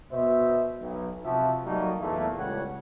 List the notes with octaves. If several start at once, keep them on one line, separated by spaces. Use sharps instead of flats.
B2 C5 E5
B1
C3 F3 F#4 G4 E5 A5
F#3 G3 A3 A#3 D#4 F#4
E2 A#2 A3
C#2 A2 C#3 G3 C#5 F#5